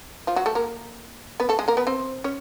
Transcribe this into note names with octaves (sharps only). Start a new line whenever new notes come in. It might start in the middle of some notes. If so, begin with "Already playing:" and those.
F3 F4
F#3 F#4
A3 A4
A#3 A#4
B3 B4
A3 A4
G#3 G#4
A#3 A#4
B3 B4
C4 C5
C#4 C#5